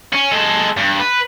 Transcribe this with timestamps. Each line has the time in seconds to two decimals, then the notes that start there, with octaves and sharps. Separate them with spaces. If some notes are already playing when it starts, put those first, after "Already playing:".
0.13 C#4
0.31 G#3 A4
0.77 G2
0.99 B4